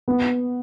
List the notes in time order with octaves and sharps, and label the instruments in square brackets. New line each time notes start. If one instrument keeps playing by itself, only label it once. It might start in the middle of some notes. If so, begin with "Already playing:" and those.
[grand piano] B3